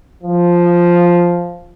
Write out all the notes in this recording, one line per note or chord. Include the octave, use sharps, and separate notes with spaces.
F3